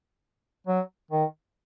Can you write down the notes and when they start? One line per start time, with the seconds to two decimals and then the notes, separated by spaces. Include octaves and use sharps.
0.67 F#3
1.11 D#3